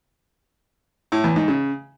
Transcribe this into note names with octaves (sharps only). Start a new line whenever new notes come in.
A2
E2
G#2
C#3